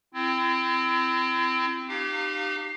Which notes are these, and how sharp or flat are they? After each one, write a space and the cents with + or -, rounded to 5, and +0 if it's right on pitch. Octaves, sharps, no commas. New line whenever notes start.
C4 +0 E4 +45
D#4 -35 G4 -15 F5 +15